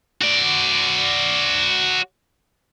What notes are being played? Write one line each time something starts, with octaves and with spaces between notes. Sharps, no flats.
F#4 D5